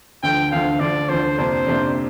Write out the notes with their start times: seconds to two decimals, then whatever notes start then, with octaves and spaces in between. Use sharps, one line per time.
0.23 D2 D3 F3 G5
0.51 D2 D3 F3 F5
0.80 D2 D3 F3 D5
1.09 D2 D3 F3 C5
1.38 F2 C3 A#3 D4 C5
1.67 F2 C3 A#3 D4